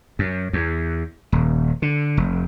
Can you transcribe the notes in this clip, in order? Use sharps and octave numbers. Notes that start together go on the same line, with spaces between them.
F#2
E2
D#1
D3
F1